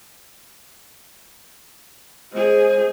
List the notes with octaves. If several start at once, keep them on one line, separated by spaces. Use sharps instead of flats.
G#3 G#4 C5